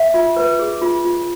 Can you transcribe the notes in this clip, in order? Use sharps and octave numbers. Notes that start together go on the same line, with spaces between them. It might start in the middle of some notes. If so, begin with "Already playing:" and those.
Already playing: E5
F4
B4
G#4
F4
F4